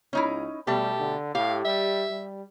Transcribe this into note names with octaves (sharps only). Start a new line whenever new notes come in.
C#2 C#4 D#4 E4
B2 G3 A3 G4 A5
D3
A2 G4 F5
G3 E5
G3